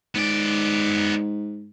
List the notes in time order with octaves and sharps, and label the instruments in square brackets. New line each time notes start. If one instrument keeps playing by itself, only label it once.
[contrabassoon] G#2 [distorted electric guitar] B3 D5